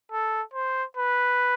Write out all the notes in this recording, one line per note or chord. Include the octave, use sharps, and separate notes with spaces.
A4
C5
B4